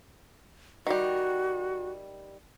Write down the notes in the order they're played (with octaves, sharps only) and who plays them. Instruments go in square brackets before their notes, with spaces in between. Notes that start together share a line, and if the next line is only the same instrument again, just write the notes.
[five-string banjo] D#3 G3 [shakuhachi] F#4